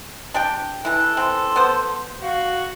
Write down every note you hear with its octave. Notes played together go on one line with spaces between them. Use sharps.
D4 G4 G5
E3 E4 A4 F#6
E3 C4 C6
B3 C5
F#4 F5